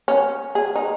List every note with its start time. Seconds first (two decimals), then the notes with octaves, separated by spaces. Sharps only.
0.08 C#4
0.55 G#4
0.75 D#4